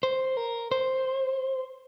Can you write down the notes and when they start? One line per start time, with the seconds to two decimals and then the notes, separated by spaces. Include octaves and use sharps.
0.03 C5
0.37 A#4
0.72 C5